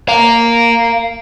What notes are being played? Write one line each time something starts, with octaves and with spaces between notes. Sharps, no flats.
F5 A#5